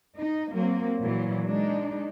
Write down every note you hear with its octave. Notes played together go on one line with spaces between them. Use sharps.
D#4
F#3 A#3 C4
A#2 E3 F#3
G#3 D4 D#4